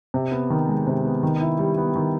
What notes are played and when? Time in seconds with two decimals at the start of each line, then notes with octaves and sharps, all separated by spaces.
0.14 C3
0.32 B3
0.50 D#3
0.68 G#3
0.87 C3
1.05 B3
1.23 D#3
1.41 E4
1.59 G3
1.78 B3
1.95 D#3